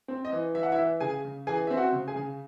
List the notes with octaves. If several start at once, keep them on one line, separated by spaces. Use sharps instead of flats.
C4
D#5
E3
E3 E5
F#5
E4 E5
E3
C#3 G#4 G#5
C#3
E3 G#4 G#5
C4 E5
F#4 F#5
C#3
G#4 G#5
C#3